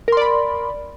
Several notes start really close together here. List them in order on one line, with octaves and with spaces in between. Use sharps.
A#4 C6 D5 B5